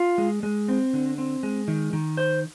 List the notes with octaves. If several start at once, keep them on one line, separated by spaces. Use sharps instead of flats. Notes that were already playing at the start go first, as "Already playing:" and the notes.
Already playing: F4
G#3
G#3
C4
D3
C4
G#3
D#3
D#3
C5